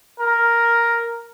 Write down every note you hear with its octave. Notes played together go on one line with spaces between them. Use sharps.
A#4